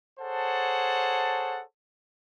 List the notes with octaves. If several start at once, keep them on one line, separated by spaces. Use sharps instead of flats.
G#4 A4 C5 C#5 F#5 A5